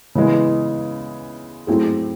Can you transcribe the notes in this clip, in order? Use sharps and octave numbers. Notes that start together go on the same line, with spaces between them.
C#3 E3 G#3 B3
F#3 A3 C4 E4 G#4